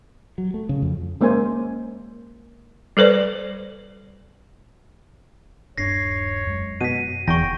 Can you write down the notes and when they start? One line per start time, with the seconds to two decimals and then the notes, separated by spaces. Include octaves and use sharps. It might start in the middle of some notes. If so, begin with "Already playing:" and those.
0.38 F#3
0.54 A3
0.69 C#3
0.82 F2
1.21 G#3 A#3 C#4 C5 G#5
2.97 G3 A4 B4 C5 D5
5.78 D#1 G2 D4 C#5 A#6 C7
6.47 F#2 G#3
6.81 B2 B6 D#7
7.28 F1 E2 G5 C#6 A#6